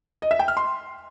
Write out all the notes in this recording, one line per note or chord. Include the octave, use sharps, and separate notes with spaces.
D#5
E5
G5
F6
C6